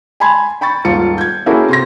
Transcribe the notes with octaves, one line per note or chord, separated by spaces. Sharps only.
G#5 A5 B5 C6 G#6
G5 B5 C#6 A6
D#1 G#2 F4 C#7
G6 G#6
A#3 C#4 E4 F#4 G#4 A4
C3 C6 A#6